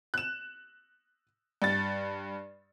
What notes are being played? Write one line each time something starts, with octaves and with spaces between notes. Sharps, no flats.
F#6 E7
G2 A6